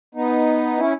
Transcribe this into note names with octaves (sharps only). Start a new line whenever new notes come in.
B3 D#4
C#4 E4